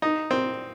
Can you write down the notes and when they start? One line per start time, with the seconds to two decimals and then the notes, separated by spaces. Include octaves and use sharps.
0.02 D#4
0.31 C4